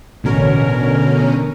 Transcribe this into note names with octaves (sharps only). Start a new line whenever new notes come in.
A1 B2 D3 C#4 A#4